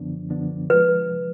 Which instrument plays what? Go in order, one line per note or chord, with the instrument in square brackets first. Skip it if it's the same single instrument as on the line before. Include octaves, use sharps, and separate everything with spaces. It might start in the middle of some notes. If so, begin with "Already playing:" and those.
Already playing: [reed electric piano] F#2 D3 F3 B3 D4
F#2 D3 F3 B3 D4
[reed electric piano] F3 G#3 [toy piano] B4